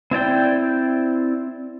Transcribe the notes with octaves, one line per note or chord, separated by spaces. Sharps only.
C4 E4 D5 G5